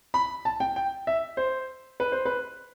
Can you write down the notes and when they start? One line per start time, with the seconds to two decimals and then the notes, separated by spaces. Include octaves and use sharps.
0.14 B5
0.45 A5
0.60 G5
0.76 G5
1.07 E5
1.37 C5
2.00 B4
2.12 C5
2.25 B4